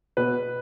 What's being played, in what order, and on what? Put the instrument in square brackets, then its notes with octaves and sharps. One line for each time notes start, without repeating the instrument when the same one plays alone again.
[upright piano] B2 B4